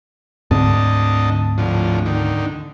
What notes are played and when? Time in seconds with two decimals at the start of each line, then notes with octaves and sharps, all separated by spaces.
0.51 D2 G#2 D3 C4 D#5 A5
1.58 A2 D3 F3
2.06 D3 D#3